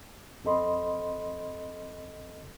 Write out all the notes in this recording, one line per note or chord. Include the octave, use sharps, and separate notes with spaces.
F2 C4 A4 D#5 B5 C6